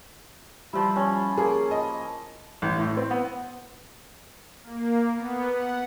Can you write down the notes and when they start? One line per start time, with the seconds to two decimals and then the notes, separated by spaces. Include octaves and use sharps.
0.73 F3 G3 E4
0.96 C#4
1.37 A#3 G#4
1.71 D#5
2.62 A1
2.79 A2
2.97 C4
3.11 B3
4.63 A#3
5.15 B3
5.49 F#5